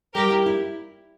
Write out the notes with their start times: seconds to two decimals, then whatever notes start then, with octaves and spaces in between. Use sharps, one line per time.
0.14 G3 G4 A#4
0.31 E4
0.46 E4